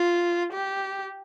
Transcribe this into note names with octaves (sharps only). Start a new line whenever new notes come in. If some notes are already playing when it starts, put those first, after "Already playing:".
Already playing: F4
G4